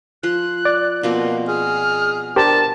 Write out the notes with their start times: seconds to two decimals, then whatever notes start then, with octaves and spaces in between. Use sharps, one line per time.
0.23 F3 F4 C6 F#6
0.65 D5
1.03 B2 F3 A#3 C4
1.48 G#4 F6
2.36 D4 G4 A#4 C5 A5